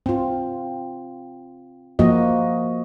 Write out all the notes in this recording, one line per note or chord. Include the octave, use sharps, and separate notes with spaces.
C4 F4
F3 A#3 F#4 D#5